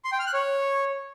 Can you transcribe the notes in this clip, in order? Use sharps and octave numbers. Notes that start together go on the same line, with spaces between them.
C6
G5
F6
F#6
C#5